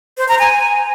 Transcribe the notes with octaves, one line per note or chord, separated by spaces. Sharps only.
C5
A#5
G#5